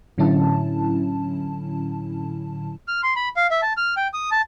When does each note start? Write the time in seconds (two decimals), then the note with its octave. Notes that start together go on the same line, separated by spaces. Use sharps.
0.18 A2 D3 F#3 C#4 E4 A5
2.88 F6
3.03 C6
3.16 B5
3.37 F5
3.51 E5
3.62 A5
3.77 F6
3.97 G5
4.14 D#6
4.31 A5